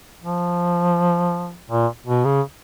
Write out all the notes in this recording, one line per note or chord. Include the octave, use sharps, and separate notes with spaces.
F3
A#2
B2
C#3